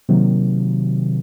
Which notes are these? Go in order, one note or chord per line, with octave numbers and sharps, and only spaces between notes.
C3 D#3 F#3 A#3